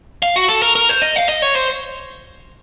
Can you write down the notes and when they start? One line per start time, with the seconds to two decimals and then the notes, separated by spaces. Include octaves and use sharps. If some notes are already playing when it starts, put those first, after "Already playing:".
0.23 F5
0.36 F#4
0.48 A4
0.62 A#4
0.76 A#4
0.89 C5
1.02 D#5
1.16 F5
1.29 D#5
1.42 C#5
1.55 C5